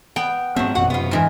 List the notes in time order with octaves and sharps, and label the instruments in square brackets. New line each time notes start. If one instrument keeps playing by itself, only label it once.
[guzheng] B3 [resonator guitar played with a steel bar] G5
[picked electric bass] G#2 B3 C4 [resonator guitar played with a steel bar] F3 F#3 [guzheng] E5
[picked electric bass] A1 F#2 B2 [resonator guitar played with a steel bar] F#4 F#5
[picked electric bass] F#2 C3 [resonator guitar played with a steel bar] B3 F4
[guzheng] G#2 E3 A#4